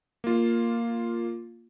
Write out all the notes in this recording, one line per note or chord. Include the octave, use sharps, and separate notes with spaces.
A#3 F4